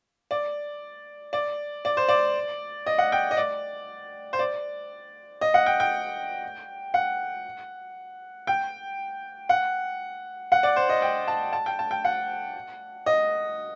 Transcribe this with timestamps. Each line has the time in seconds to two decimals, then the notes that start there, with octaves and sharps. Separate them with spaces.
0.31 D5
1.33 D5
1.85 D5
1.97 C5
2.09 D5
2.86 D#5
2.98 F#5
3.12 G5
3.31 D#5
3.37 D5
4.33 C5
4.39 D5
5.41 D#5
5.54 F#5
5.66 G5
5.80 G5
6.94 F#5
8.47 G5
9.49 F#5
10.52 F#5
10.63 D5
10.76 C5
10.89 D#5
11.02 G5
11.28 A5
11.53 A5
11.66 G5
11.79 A5
11.91 G5
12.05 F#5
13.06 D#5